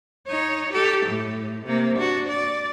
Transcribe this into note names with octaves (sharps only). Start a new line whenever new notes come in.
D#4 C#5
G4 A4
A2
C3 A#3
D4 F#4
D5